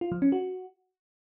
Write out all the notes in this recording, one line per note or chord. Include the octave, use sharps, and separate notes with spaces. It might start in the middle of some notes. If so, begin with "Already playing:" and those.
F4
F3
C#4
F#4